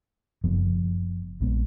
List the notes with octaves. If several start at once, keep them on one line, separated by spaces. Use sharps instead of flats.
F#1 F#2 F3 B3
A#1 A#2 G#3 B3